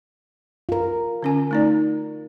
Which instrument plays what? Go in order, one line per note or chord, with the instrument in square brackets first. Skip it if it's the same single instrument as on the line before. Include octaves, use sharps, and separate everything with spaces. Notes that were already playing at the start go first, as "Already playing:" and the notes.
[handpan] F4 A#4
[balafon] D3 C#4 G#5
A3 D#4 D5